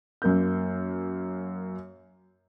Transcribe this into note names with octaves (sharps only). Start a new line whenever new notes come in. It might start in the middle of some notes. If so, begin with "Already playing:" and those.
F#2 A#3 G6